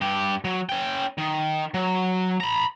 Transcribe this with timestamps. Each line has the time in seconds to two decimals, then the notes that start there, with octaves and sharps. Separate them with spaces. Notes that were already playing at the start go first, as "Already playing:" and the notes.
0.01 G2 G4
0.45 F#3
0.69 C#4 G5
1.18 D#3
1.74 F#3
2.41 A#5 B5